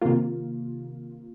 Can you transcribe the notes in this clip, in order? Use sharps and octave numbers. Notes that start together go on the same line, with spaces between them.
C3 D#3 A#3 F4